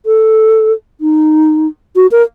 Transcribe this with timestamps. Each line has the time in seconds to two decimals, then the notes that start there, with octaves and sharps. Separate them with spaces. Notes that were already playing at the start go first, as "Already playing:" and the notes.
0.06 A4
1.01 D#4
1.96 F#4
2.11 A#4